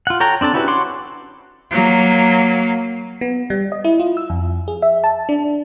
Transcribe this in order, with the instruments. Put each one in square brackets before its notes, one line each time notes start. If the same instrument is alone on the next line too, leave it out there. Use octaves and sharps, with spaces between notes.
[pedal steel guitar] F4 F#5
A4 C#5 G5 A#5
C4 D4 A4 A5
C#4 E4 F#4 G4 B4
C#5 F#5 C6 D6
[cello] F#3 A#3
[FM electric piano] B3
G3
D#5
E4
F4
E6
F2
G#4
E5
A5
D4